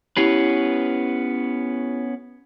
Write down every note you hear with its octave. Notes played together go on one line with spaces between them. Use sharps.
B3 C#4 E4 G4 B4 C7